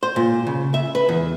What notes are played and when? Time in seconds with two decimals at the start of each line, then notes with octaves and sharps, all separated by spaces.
0.03 C5
0.16 A#2
0.47 C#3
0.74 E5
0.95 B4
1.09 E2